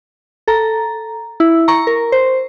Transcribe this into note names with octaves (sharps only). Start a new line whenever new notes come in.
A4 A#5
E4
A#5 C#6
A#4
C5